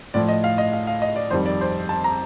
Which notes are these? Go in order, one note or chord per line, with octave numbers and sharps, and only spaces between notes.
A2 F3 D5
D#5
F5
D#5
F5
F5
D#5
D5
F2 D#3 G3 C5
D5
C5
A5
A#5